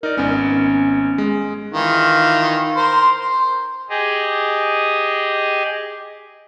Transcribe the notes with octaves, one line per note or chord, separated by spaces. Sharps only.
D#4 A#4 D5
G#1 B3 C#4
G#3
D#3 E3 F4
A#4 C5
C5
G4 G#4 D#5